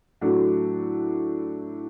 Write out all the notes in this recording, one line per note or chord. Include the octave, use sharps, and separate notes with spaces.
A2 F#3 A3 D4 F#4